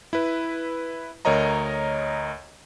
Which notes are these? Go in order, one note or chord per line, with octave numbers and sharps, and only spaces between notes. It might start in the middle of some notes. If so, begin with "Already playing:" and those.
E4 B4
D2 A#4 C#5 D#5 A#5